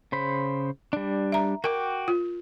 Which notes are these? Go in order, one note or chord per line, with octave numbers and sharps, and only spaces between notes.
C#3 C5 B5
G3 D4
E5 A#5
F#4 A#4 G5 D6
F4